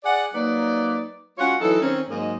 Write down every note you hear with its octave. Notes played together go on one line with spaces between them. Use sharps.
G#4 D5 F#5
F#3 A#3 D#4 B4 D5
G#3 C#4 F4 F#4 C#5 F#5
E3 F#3 D#4 E4 A4
D#3 C4 C#4
G#2 F#3 G#3 A#3 D#5